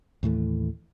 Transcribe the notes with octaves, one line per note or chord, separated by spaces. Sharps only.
D#2 A2 E3 A3